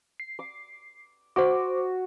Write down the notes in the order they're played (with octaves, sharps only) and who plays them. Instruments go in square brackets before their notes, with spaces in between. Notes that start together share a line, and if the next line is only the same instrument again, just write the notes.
[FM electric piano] C7
[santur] D6
[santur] F#4 [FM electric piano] C5 D6